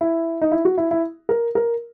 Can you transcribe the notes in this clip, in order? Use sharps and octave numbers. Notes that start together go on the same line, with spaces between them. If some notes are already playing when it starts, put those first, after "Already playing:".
E4
D#4
E4
F#4
E4
E4
A#4
A#4